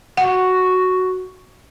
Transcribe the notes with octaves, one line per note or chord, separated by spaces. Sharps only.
F#4 F#5